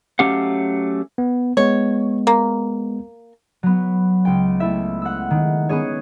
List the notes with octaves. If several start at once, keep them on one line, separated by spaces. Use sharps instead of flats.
F#3 A3 C#4 G4 F5 F#5
B3
G#3 B3 C#5
A#3
F#3 B3
C#2 G5
A3 E4 E5
F#5 E6
D#3
B3 C#4 G#4 C#5